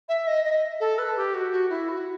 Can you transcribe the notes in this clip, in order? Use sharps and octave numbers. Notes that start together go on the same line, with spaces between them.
E5
D#5
D#5
A4
B4
G4
F#4
F#4
E4
F#4